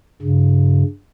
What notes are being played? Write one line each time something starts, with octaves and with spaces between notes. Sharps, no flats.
G2 C#3